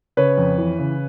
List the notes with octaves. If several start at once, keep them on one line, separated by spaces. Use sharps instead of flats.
C#3 B4 C#5
F2
E3
C#3